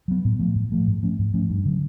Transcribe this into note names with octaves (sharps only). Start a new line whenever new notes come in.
F#3 B3
A2
F3 A3
A2
F3 A3
G#2
F3 A3 C#4
G#2
F3 A3 C#4
G2
D3 F#3